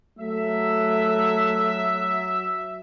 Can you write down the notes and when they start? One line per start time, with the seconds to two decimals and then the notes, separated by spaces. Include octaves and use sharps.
0.19 F#3 A3 E5